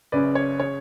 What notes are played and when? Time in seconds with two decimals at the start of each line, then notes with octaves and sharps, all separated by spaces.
0.12 F#1 F#2 C#3 B4 D5
0.35 C#5
0.60 C#3 C#5